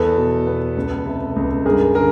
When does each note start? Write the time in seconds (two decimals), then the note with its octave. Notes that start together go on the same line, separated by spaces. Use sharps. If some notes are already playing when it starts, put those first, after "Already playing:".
Already playing: E2 A4 B4
0.17 B2
0.47 B3
0.77 C#2
1.06 C3
1.36 C#2
1.66 G2 G#4 A#4
1.95 D3 G#4 A#4